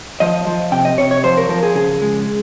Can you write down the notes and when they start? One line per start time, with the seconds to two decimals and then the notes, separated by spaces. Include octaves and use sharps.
0.20 F3 D#5
0.47 F3
0.72 C3 G5
0.85 D#5
0.98 C3 C#5
1.11 C#5
1.24 F3 C5
1.37 A#4
1.49 F3 A#4
1.63 G#4
1.75 C#3 G#4
2.02 G#3